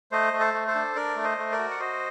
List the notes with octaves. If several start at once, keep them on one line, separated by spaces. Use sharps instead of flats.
A3 C5 D#5
A3
A4 C5
A3
A4 C5
D4
D4 A#4 D5
A3
C5 D#5
A3
A#4 D5
F#4
F#5
F#4 C5 D#5